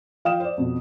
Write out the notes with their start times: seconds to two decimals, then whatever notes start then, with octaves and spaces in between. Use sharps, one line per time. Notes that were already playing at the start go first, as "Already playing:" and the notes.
0.25 F3 F5 G5 D#6 E7
0.40 C5 D5
0.57 F2 B2